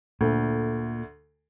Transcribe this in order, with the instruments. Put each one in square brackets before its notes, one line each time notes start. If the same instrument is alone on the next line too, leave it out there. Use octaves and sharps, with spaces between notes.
[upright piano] D2 D3 A3 [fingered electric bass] A#2